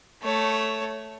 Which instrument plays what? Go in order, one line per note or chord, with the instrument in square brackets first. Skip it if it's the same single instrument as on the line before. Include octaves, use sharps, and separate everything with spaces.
[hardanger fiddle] A3 C#5